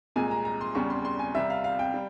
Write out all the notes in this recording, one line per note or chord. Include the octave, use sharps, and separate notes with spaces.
C2 A#2 G#3 G#5
A#5
A#5
C6
E2 C#3 G3 C#6
C6
C6
G#5
C2 C3 G3 E5
F5
F5
G5
G3